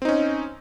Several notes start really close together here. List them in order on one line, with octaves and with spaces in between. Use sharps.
C4 D#4 C#4